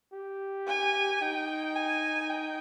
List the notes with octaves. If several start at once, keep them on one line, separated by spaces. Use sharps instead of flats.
G4
G#5
D#4 G5
G#5
G5